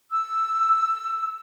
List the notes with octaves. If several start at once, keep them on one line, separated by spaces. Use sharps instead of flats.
E6